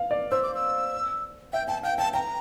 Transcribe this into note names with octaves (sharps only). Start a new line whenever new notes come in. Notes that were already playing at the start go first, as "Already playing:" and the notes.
Already playing: F5
D5
C5 E6
D6
E6
E5 G5
G5 A5
F5 G5
G5 A5
G5 A#5